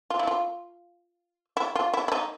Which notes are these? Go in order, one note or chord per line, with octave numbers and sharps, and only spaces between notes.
F4
E4
F4
E4
F4
E4
E4
D#4